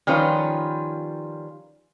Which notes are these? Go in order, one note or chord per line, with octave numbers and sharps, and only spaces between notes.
D#3 F3 G3 C#4 F4 B4